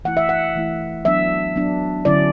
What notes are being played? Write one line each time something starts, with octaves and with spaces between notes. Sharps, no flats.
E3 A3 E4 F#5
E5
F#5
E3 A3 E4
F#3 B3 D4 E5
F#3 B3 D4
D3 F#3 C#4 E4 D5